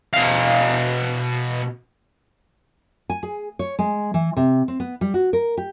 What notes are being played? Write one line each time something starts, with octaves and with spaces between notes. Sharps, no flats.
B2 F5
G#5
G#4
C#5
G#3
E3
C3
C4
B3
G3
F#4
A#4
G4